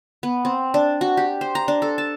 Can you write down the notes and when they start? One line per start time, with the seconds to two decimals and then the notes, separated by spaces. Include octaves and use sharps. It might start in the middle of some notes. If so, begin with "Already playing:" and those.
0.23 B3
0.45 C4
0.74 D4
1.01 F#4
1.17 G4
1.41 C5
1.55 A#5
1.68 D4
1.82 A4
1.98 A5